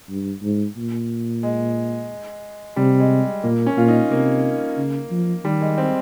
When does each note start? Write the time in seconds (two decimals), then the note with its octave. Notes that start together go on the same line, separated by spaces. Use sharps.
0.09 G2
0.43 G#2
0.77 A#2
1.43 G#3
2.76 C3 G3
3.00 G#3
3.43 A#2 A#3
3.66 C#4
3.77 A#2 F4
3.88 D#4
4.11 C3 A#3
4.77 C#3
5.11 F3
5.44 D#3 G3
5.61 G#3
5.78 C4